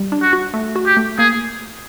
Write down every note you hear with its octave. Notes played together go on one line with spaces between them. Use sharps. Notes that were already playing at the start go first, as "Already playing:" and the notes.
Already playing: G3
D4
F#4
F#4
A3
F#4
G4
A3
A#3 G#4